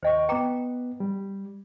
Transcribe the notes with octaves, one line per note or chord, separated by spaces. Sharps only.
D#2 C5 D#5 G5 C#6
B3 B4 G5 A#5 D6
G3